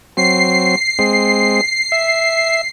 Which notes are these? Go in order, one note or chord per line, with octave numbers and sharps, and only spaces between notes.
F#3 C4 C7
G#3 C4
E5